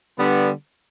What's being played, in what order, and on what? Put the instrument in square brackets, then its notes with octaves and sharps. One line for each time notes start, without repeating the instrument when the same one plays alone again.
[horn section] D3 G3 B3